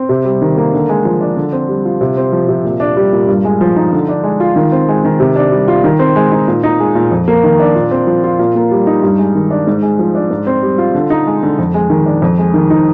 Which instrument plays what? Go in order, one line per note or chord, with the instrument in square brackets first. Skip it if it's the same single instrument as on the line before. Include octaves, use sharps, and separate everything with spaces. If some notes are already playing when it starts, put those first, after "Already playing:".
Already playing: [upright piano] C4
C3
G3
D#3
A#3
D3
G#3
F3
D4
D3
C4
G3
F4
C3
C4
F3
C3
A#2
D4
G3
A#2
G2
G#3
F3
D#4
D3
D4
G#3
F4
D#3
C4
G#3
D#3
C3
D4
G3
F4
D#3
C4
G#3
D#4
A#2
D#4
G#3
A#2
F2
A#3
D#3
D4
A#2
C4
F3
F4
A#2
A#3
G3
D#4
G2
G#3
D#3
D4
G#2
G#3
F3
D4
G#2
C4
G3
F4
D3
D#4
G#3
D3
F2
G#3
D#3
D4
F2
G#3
D#3
D#4